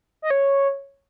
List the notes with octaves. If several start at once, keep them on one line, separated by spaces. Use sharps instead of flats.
D#5
C#5